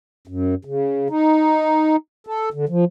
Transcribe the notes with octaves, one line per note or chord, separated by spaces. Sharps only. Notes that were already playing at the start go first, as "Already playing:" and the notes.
F#2
C#3
D#4
A4
D3
F3